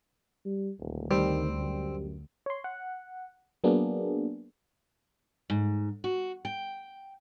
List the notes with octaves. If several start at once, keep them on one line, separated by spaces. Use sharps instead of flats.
G3
D#1 D2
D#3 G3 C4
F#2
C#5 C6
F#5
F#3 A#3 B3 D4 G#4
G#2
F#4
G5